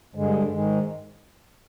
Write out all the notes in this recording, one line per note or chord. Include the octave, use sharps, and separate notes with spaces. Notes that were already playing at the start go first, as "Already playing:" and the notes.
G2 D3 G#3
G#2 D#3 G#3